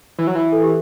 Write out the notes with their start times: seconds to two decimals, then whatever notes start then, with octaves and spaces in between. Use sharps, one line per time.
0.19 E3
0.27 F#3
0.35 E3
0.52 A4
0.63 G4